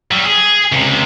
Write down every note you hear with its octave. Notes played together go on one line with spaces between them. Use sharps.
F#3 G3
G#4
C#2 C3